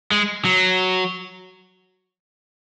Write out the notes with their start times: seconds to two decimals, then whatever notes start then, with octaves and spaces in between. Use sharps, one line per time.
0.11 G#3
0.45 F#3